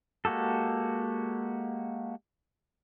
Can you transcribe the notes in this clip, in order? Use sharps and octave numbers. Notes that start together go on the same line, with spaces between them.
G#3 A#3 F#4 G4 A4